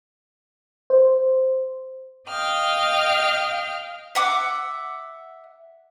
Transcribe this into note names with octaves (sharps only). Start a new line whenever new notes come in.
C5
D#5 F5 G5 F6
E5 F#5 D6